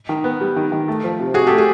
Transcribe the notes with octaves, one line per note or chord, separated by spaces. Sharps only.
D#3
B3
G3
D#3
D#3
A3
F3
C3
C3 F#4 G#4
A3 G4 A4
G#4